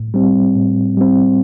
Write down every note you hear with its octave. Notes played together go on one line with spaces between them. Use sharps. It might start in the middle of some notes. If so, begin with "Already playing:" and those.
Already playing: A2
G3 C4
A2
G3 C4